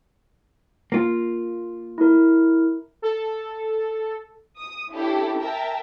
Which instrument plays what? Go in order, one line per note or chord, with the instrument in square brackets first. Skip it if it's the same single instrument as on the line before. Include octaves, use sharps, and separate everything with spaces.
[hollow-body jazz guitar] A#3 F4
[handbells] E4 A#4
[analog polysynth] A4
[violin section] D#6
C#4 D4 E4 G4 A4
A#4 E5 G5 A5 A#5